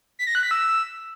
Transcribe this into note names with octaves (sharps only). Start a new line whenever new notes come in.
B6
A#6
F#6
B6
E6